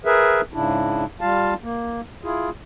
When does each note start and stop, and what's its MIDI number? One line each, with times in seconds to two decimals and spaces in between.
0.05 0.41 68
0.05 0.41 70
0.05 0.41 71
0.05 0.41 76
0.54 1.05 44
0.54 1.05 49
0.54 1.05 62
0.54 1.05 64
1.21 1.54 55
1.21 1.54 65
1.21 1.54 77
1.21 1.54 81
1.63 2.01 58
2.24 2.50 64
2.24 2.50 65
2.24 2.50 68